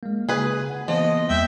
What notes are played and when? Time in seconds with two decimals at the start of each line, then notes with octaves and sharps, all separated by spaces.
0.03 G#3 A#3
0.29 C#3 G#4 B4
0.70 F#5
0.88 E3 F3 A#3 B3 D#5
1.29 E2 G3 E5 G5